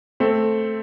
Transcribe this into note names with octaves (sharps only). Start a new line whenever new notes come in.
A3 C4